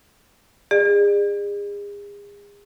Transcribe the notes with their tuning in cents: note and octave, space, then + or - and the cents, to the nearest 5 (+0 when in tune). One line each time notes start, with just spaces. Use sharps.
G#4 -35 D5 +35